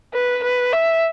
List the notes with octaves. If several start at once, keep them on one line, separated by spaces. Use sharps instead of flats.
B4
B4
E5